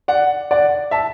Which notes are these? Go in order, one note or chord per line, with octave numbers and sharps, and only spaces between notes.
D5 F#5
D5 F#5
E5 A5